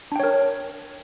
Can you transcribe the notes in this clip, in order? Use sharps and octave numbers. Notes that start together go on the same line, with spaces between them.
D4 A#4 C#5 G5